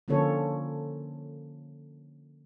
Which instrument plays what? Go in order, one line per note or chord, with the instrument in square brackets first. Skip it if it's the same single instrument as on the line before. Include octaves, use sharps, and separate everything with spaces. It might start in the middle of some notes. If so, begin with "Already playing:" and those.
[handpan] D3 F3 A#3 C#4 A4 C#5